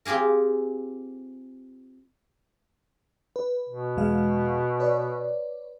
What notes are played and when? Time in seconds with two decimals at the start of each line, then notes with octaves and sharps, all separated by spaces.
0.05 C4 F4 G4 G#4 A#4
3.36 B4
3.69 B2
3.97 E2 G#3 F5
4.80 B4 C#5 D5